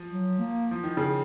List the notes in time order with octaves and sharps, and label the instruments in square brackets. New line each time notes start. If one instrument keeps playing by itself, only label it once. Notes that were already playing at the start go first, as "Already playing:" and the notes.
Already playing: [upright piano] F3
[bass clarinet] F#3
A#3
[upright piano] F3
D#3
C#3